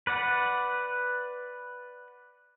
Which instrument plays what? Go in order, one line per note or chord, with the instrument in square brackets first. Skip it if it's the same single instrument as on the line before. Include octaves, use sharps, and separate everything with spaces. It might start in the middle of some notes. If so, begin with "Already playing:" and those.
[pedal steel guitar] B4 D5 F#5